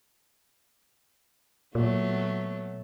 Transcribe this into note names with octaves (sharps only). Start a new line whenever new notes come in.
A#2 F#3 A3 B3